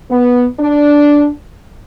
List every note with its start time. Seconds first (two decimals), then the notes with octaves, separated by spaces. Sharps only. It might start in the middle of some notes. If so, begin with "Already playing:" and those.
0.10 B3
0.59 D4